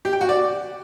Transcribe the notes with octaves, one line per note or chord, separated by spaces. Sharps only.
G4
G5
F#4
D5